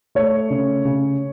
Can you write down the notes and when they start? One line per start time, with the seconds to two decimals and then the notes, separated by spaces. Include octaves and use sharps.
0.15 A3 C#5
0.50 C#3
0.85 C#3